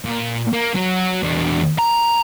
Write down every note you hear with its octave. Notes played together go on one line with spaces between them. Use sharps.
A#2
A#3
F#3
E2 D4
A#5